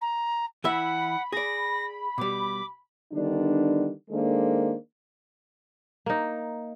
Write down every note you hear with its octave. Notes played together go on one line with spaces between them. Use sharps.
A#5
E3 E4 E5 F#5 B5
G#4 D5 A#6
B2 G3 D6
D3 D#3 G3 B3 D4 D#4
D#3 G#3 A#3 D4 A4 C5
A#3 D#4